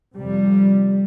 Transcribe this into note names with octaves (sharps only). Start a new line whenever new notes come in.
F2 C3 G3